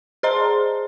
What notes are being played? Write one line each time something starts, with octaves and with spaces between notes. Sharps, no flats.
G#4 C5 D#5 A#5 C6